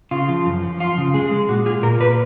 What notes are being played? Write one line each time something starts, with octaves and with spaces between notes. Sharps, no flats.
C#3 F4
F3
F#2
F3
F3 F4
C#3
G#3 G#4
G#3
A#2 F#4
F4 G#4
A#2 A#4
A#2 B4